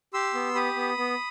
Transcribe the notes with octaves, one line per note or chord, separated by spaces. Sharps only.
G4 C6 E6
B3
G4 B5 D#6
B3
B3